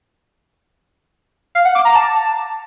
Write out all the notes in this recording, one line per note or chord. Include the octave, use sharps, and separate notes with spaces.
F5
F#5
D6
A#5
A5